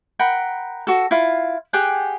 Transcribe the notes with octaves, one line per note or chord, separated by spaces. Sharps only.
A#4 F#5 G5 B5
F#4 A4
E4 F4 F5
G4 G#4 F#5 G5